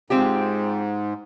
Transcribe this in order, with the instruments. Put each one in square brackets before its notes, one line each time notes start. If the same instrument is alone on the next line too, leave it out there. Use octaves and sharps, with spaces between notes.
[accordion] G#2 [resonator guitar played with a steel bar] C4 F4 G4